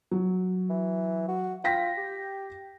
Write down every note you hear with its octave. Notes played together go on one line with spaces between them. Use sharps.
F#3
E3
F#4
F4 G5 A#6 B6
G4